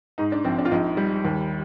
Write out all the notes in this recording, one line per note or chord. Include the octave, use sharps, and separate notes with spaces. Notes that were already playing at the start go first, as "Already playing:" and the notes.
G#2 D#4
D4
A#1 C4
D4
F4
A#1 D#4
G3
D#2